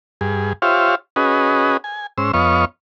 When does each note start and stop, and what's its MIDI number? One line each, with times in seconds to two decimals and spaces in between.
0.21 0.53 43
0.21 0.53 68
0.62 0.95 65
0.62 0.95 67
0.62 0.95 72
0.62 0.95 73
0.62 0.95 76
0.62 0.95 77
1.16 1.77 61
1.16 1.77 66
1.16 1.77 68
1.16 1.77 71
1.16 1.77 75
1.84 2.07 80
2.18 2.32 44
2.18 2.32 61
2.18 2.32 72
2.18 2.32 88
2.34 2.65 41
2.34 2.65 59
2.34 2.65 73
2.34 2.65 75
2.34 2.65 77
2.34 2.65 85